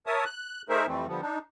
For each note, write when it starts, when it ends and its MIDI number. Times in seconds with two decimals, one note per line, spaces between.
0.06 0.24 70
0.06 0.24 73
0.06 0.24 76
0.06 0.24 81
0.06 0.24 87
0.25 0.62 90
0.69 0.86 57
0.69 0.86 63
0.69 0.86 68
0.69 0.86 70
0.69 0.86 72
0.69 0.86 76
0.87 1.07 41
0.87 1.07 52
0.87 1.07 55
0.87 1.07 57
0.87 1.07 60
1.07 1.21 50
1.07 1.21 53
1.07 1.21 55
1.07 1.21 59
1.21 1.39 62
1.21 1.39 63